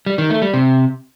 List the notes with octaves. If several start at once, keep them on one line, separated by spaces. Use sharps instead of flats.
G3
D#3
A3
G3
C3